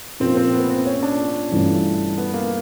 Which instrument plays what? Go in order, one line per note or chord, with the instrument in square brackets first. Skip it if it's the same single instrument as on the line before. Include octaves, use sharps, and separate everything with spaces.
[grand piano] A#2 F3 A#3 [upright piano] C4
[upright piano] C4
B3
C4
C#4
D4
[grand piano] G2 E3 A3 C#4 F4
[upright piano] B3
A#3